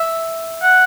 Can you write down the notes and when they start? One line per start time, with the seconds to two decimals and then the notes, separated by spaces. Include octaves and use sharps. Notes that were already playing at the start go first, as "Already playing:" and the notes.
Already playing: E5
0.62 F#5